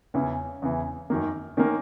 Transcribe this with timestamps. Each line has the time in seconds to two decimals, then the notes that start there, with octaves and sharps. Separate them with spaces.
0.14 E2 C#3 E3 C#4
0.62 E2 C#3 E3
1.10 F#2 D#3 A#3
1.57 D#3 A#3 C#4